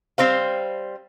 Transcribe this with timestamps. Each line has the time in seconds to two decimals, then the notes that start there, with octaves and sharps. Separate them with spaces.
0.18 G3 C4 C5 F5